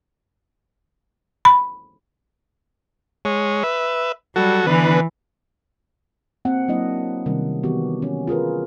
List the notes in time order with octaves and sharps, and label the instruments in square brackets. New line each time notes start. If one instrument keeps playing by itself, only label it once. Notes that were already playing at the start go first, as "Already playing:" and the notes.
[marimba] B5
[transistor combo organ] G#3 C#5
B4 E5
[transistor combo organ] F#3 F#4 A4 [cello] G3
[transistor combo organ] D3 B3 B4 [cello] E3
[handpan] A#3 C4 F#5
F#3 A#3 D4 E4 D#5
C3 D#3 G3 C#4
D#3 E3 B3 F#4 G4
C#4
F4 G#4 A#4 B4